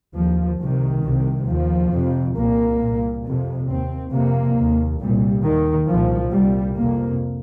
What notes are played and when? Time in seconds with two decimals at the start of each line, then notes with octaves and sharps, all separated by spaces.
0.15 D#2 F3
0.59 C2 C3 D#3
1.04 C2 C3
1.47 D#2 F3
1.92 F2 C3
2.35 C2 A#2 A#3
2.80 C2 A#2
3.24 F2 C3
3.68 D#2 C4
4.12 F2 C3 A#3
4.56 D#2
5.00 C2 A#2 G3
5.44 D#2 D#3
5.89 C2 A#2 F3
6.32 C2 G3
6.37 A#2
6.76 F2 C3 A#3